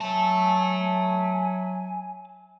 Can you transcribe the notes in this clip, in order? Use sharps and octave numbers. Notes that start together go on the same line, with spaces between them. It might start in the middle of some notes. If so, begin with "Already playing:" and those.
F#3 E5 G#5 A5